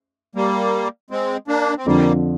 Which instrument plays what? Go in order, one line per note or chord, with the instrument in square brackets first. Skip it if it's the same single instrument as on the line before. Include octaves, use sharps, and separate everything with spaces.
[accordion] G3 A#3
G#3 C4
A#3 D4
C4
[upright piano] F2 D3 F3 [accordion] G3 A#3